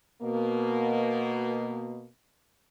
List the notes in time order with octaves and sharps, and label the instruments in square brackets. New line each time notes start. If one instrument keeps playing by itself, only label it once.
[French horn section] B2 A#3